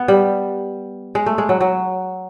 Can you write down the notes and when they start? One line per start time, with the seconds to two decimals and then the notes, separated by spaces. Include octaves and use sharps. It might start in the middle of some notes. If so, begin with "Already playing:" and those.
Already playing: B3
0.08 G3
1.15 G#3
1.26 A3
1.38 G#3
1.49 F#3
1.61 F#3